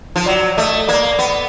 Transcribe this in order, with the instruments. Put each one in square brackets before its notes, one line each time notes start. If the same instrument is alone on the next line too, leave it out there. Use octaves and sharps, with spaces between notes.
[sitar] F3
[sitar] F#3 [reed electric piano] D5
[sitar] A3 [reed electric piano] D#5
[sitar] A#3 [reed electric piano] D5
[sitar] B3